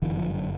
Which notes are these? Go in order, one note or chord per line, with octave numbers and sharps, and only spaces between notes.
G1 F#2 D3 E3
F3
F#3